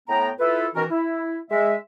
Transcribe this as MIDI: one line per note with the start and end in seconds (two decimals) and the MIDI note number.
0.08 0.30 45
0.08 0.30 59
0.08 0.30 79
0.08 0.30 82
0.39 0.66 64
0.39 0.66 65
0.39 0.66 69
0.39 0.66 71
0.74 0.84 47
0.74 0.84 51
0.74 0.84 52
0.74 0.84 61
0.74 0.84 66
0.74 0.84 70
0.90 1.37 64
1.50 1.75 56
1.50 1.75 76